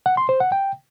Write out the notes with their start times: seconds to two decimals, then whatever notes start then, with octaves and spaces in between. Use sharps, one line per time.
0.06 F#5
0.17 C6
0.29 C5
0.40 F#5
0.52 G5